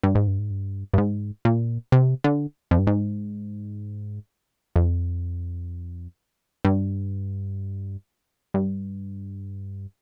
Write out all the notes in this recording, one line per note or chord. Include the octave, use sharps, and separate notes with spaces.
G2
G#2
G2
G#2
G2
G2
G#2
A#2
C3
D3
F2
G2
G#2
F2
G2
G2